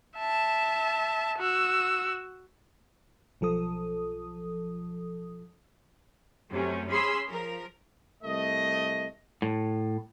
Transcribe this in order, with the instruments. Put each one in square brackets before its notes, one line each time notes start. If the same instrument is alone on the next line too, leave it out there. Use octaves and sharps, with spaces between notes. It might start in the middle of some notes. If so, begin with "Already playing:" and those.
[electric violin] E5 A5
F#4 E6
[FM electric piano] B1 F3 A4 D#6
[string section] F#2 C3 A3 C#4
C#4 G#4 B5 C6 E6
F3 A#4
[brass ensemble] C2 A3 D#5
[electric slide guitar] A2